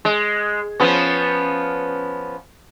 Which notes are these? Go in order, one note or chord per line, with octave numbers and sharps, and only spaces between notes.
G#3
F3 B3 C#4